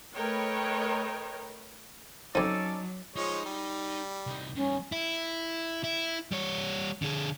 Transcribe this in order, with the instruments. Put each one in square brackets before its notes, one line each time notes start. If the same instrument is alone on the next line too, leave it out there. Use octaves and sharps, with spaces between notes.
[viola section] A3 A#4 B4 C#5 D#5 G5
[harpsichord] F2 F3 [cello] F#3 [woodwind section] C#4 A4 D5 [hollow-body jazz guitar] D#4
[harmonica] F3 G#3 C#5 [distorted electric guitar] D#4
[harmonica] G3
[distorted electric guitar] C2 D#4
[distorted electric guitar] G2 D#3 [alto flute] C#4
[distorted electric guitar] E4
E4
G3 C#5
D3 G#4